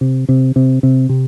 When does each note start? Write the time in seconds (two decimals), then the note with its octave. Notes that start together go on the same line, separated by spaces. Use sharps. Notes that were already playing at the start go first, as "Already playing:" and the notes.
0.01 C3
0.29 C3
0.56 C3
0.83 C3
1.09 C3